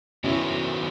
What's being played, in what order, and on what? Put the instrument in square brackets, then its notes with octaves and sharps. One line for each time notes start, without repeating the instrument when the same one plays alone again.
[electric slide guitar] D#3 F#3 B3 F#4 A4 [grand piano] C#4 E4